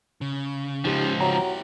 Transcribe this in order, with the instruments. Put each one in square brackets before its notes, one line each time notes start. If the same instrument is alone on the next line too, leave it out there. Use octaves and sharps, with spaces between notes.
[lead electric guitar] C#3
[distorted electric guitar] C#2 F3 [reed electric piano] D#4 G4
[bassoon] F#3 [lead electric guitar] E4 G4 [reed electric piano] A#5